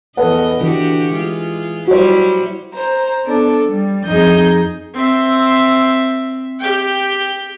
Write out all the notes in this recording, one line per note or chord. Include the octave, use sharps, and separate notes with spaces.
E2 A4 B4 D#5 F#5
D3 E3 F#4 G4
G#3 F4
F#3 G3 E4 F#4 C5
C5 A#5
B3 D4 A4
G3
F2 D#4 G#4 D#5 G6
C4 E5
G4 G5